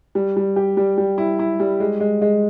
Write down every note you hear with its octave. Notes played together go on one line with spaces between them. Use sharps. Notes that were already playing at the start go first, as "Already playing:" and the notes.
G3
G3
G4
G3
G3
E4
E4
G3
G#3
G#3
G#3